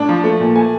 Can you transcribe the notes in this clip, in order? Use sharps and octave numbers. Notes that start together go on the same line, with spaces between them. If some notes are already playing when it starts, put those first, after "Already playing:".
Already playing: A2 D4
F3
A3
A#2
A3 G#5